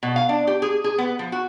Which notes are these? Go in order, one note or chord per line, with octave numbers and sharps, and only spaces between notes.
B2
F5
D4
G4
G#4
G#4
B3
F3
F#4